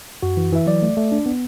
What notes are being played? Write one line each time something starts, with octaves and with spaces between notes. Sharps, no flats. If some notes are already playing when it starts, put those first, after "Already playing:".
F#2 F#4
E3
E3 E5
F#3 D5
A3
A3
D4
B3